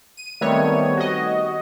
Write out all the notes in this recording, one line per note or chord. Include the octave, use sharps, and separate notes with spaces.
D#7
D#3 G3 A3 B3 C4 C#5
F#4 D#5